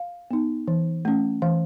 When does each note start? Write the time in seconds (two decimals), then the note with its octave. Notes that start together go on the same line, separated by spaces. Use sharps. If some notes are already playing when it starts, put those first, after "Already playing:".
Already playing: F5
0.31 B3 D#4
0.68 E3
1.05 A3 C#4
1.42 E3 F5